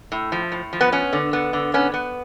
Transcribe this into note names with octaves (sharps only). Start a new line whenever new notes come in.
A2
F3
A2
F3
B3
B3 C#4
D3
B3
D3
B3 C#4
B3